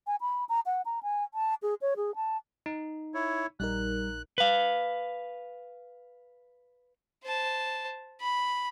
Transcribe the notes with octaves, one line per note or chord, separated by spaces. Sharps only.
G#5
B5
A#5
F#5
A#5
G#5
A5
G#4
C#5
G#4
A5
D#4
E4 C#5
A#1 G3 D#4 A#4 F#6
B4 F5
C5 A5
B5